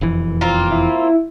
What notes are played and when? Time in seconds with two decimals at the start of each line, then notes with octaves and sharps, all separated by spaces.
0.01 E1 F2 E3
0.41 A#3 C4 F4
0.71 E4